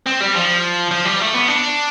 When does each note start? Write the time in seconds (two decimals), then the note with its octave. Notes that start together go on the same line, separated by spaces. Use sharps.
0.06 C4
0.20 G3
0.35 F3
0.91 F3
1.05 G3
1.20 A3
1.34 B3
1.48 D4